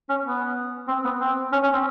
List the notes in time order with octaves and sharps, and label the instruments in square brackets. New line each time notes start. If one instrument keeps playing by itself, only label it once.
[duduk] C#4
B3
C4
B3
C4
C#4
C#4
C4